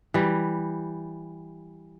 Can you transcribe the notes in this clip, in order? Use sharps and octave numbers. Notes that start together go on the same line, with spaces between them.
E3 G3